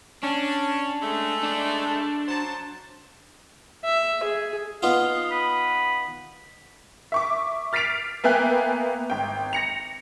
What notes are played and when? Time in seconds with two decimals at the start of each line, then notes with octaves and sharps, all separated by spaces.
0.23 C#4 D4
1.02 G#3 A3
1.43 D4 D5
2.28 F#3 C5 A5
3.84 E5
4.23 G#4
4.82 B3 D#4 F4 F5
5.30 B4
7.12 E5 C#6 D6
7.73 F6 A6 B6 C7 D7 F7
8.24 A#3 B3 E5 G5 G#5 F#6
9.10 G#1 G5
9.53 A#6 C#7 F7